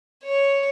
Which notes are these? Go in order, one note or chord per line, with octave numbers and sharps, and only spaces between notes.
C#5